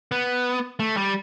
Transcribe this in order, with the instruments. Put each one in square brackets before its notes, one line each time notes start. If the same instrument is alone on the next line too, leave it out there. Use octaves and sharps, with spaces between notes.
[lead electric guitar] B3
A3
G3